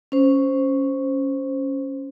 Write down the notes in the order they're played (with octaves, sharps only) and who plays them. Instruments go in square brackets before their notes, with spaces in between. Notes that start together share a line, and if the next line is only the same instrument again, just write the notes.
[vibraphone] C#4 C5